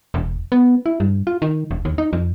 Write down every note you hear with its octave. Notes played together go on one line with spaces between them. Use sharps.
E1
B3
E4
G2
F4
D#3
E1
D#2
D#4
F2